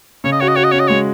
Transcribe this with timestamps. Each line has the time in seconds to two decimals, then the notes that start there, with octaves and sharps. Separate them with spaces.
0.24 C#3 C#5
0.32 D#5
0.41 F#4 C#5
0.48 D#5
0.56 F#4 C#5
0.64 D#5
0.72 C#4 C#5
0.80 D#5
0.88 G#3 C#5